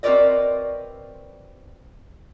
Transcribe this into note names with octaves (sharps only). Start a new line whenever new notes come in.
C4 F#4 A#4 B4 D5 D#5